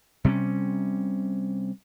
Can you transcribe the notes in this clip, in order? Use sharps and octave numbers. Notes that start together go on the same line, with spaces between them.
C3 G3 A3 C#4